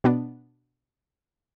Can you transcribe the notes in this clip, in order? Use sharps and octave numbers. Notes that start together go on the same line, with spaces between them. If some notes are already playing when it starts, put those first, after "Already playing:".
B2 B3 D4